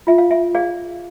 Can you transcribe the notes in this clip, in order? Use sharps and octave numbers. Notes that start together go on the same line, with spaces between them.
F4 E5
F5
E5
G#4 D5 F5